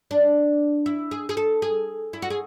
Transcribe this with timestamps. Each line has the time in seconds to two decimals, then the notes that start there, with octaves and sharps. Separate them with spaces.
0.11 D4
0.86 E4
1.11 G#4
1.29 G#4
1.37 A4
1.62 G#4
2.13 E4
2.22 F#4
2.30 G#4